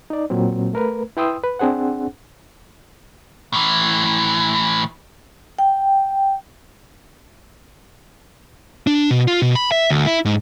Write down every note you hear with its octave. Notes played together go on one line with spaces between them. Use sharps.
D#4 D5
A#2 F#3 C4
A3 A#4 B4
E4 B4 G5 C6 D#6 E6
B4
C4 D4 G#4 C5 F#5
A2 E3
G5
D4
B2
F4
B2
B5
E5
D2
E4
G#2